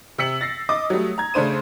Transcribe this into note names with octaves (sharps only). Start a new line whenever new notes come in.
C3 E6 B6 C#7 F#7
A6 A#6 C7
D#5 D6 D#6
F#3 G3 A3
A#5 G#6
C#3 A3 D4 C5 D#7